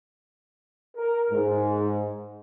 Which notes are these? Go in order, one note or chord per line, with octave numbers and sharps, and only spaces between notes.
A#4
G#2